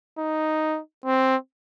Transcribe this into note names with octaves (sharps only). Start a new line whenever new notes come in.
D#4
C4